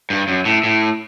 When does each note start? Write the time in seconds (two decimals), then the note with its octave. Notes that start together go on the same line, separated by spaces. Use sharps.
0.10 G2
0.28 F#2
0.45 A2
0.63 A2